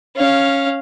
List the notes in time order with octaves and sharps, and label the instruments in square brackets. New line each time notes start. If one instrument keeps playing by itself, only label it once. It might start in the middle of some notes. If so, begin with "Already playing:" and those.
[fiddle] C#4 F5